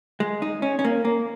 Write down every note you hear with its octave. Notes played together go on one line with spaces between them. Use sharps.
G#3
D#4
C#4
C#4
A#3
A#3